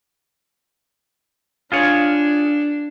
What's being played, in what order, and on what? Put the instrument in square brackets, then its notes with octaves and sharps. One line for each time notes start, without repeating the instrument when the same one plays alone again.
[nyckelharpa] D4 [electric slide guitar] F4 G#4 C#5